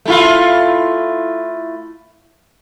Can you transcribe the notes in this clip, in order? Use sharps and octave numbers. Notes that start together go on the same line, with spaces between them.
A3 E4 F4